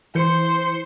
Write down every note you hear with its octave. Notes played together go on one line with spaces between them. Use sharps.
E3 C5 G6 C#7